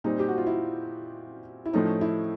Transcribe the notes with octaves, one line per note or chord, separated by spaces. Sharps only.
A#2 G3 C4 D#4
G4
F#4
F4
E4
E4
A2 F3 A3 C#4 D#4
E4